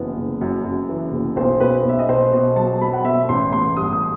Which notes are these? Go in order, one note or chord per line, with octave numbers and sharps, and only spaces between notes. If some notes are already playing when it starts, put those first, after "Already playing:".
Already playing: F#1 E3 B3
F#1
F#2
F#2
E3
F#1
B1 C5
B1 B4
B1 E5
D#5
B2 C5
B2 D#5
F#3 A5
F#3 B5
F#5
B2 E5
A1 C6
A1 C6
G2 D#6
D#6